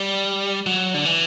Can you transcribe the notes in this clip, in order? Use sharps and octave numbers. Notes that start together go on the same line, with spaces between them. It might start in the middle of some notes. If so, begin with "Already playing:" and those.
Already playing: G3
F#3
D3
E3